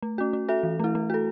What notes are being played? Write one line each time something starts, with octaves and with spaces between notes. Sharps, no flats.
A3
C#4 F#4
C#4
F#4 A4 E5
E3
A3 E4
A3
F#4 A4